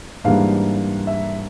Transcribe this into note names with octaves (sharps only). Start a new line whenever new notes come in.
G#2 E3 G3 A#3 D4 F5
E5